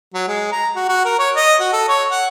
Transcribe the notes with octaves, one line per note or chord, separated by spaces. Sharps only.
F#3
G#3
A#5
F#4
F#4
A#4
C#5
D#5
F#4
A4
C#5
F#5